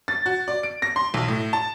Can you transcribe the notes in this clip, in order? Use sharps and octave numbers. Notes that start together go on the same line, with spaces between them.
A6
F#4
D5
D7
A#6
C6
B1
A2
A5